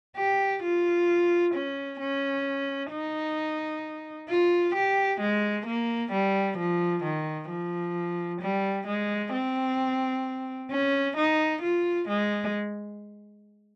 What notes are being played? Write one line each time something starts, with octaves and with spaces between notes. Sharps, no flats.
G4
F4
C#4
C#4
D#4
F4
G4
G#3
A#3
G3
F3
D#3
F3
G3
G#3
C4
C#4
D#4
F4
G#3